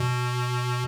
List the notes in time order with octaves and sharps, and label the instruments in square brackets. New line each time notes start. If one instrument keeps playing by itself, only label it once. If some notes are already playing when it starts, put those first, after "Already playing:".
Already playing: [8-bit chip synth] B2